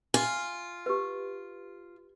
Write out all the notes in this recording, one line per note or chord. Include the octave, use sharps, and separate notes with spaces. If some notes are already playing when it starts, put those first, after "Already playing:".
F4 G#5
G4 B4